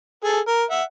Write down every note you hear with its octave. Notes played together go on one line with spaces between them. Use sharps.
G#4 A4
A#4
E5 F#5